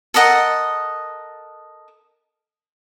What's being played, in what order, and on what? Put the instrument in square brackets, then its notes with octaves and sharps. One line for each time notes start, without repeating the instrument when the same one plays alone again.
[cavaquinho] A4 A#4 D#5 F#5